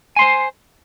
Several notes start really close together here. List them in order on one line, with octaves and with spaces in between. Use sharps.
G#5 C6 C5